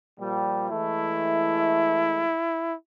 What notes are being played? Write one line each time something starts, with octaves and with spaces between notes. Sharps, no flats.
A#2 F3 G3
E3 G#3 A3 E4